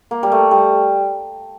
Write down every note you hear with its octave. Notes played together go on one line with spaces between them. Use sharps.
A#3
G3
A3
G3